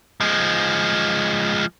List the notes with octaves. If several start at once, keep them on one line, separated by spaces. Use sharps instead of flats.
F3 G#3